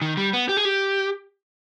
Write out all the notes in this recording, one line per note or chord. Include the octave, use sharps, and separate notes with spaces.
D#3
G3
B3
G4
G#4
G4